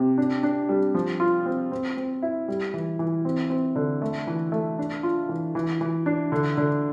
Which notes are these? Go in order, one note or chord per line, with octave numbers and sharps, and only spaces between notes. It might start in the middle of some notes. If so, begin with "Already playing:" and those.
Already playing: C3
D4
D4
G3
F3
F4
C4
C4
C4
E4
G3
E3
E3
C4
C4
D3
A3
E3
A3
D4
F4
E3
E3
E3
D4
D3
D3